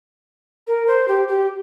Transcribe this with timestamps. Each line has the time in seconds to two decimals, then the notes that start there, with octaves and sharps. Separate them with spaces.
0.67 A#4
0.87 C5
1.08 G4
1.28 G4